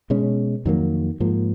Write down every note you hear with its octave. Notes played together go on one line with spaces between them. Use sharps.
B2 G#3 C#4
F2 D#3 F#3 A#3
G#2 F3 A#3